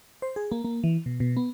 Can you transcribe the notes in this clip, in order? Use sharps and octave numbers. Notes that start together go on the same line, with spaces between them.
C5
G#4
A#3
A#3
E3
B2
B2
B3